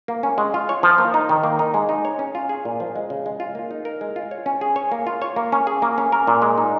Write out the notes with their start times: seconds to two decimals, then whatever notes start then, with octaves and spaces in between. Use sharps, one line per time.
0.08 A#3
0.23 C#4
0.38 G#3
0.54 F4
0.69 C#5
0.83 F3
0.98 A#3
1.14 D#4
1.29 D#3
1.44 A#3
1.59 D#4
1.74 G#3
1.89 D#4
2.05 C#5
2.19 C#4
2.35 F4
2.49 G#4
2.65 A#2
2.80 F3
2.96 G#3
3.10 C#3
3.26 G#3
3.40 F4
3.55 A#3
3.71 D#4
3.85 A#4
4.01 G#3
4.16 F4
4.31 C#5
4.46 C#4
4.61 G#4
4.76 C#5
4.92 A#3
5.07 F4
5.22 C#5
5.36 A#3
5.52 C#4
5.67 G#4
5.82 A#3
5.98 C#4
6.12 A#4
6.27 A#2
6.42 G#3
6.58 D#4